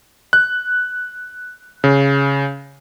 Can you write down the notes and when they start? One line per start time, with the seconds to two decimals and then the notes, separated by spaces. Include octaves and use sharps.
0.33 F#6
1.84 C#3